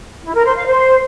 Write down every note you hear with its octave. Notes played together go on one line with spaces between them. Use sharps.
E4
A#4
C5
F5
C5